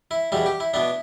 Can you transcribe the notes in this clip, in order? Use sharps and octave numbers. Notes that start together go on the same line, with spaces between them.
E4
E2 B2 G3 E4
G4
E4
B2 B3 D4 E4